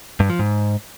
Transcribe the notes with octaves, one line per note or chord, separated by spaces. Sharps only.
G2
F3
G#2